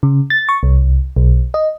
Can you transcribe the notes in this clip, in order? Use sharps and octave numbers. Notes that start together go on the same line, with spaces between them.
C#3
A6
C#6
C2
B1
D#5